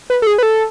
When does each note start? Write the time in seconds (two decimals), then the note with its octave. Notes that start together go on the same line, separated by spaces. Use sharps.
0.10 B4
0.22 A4
0.27 G#4
0.38 B4
0.43 A4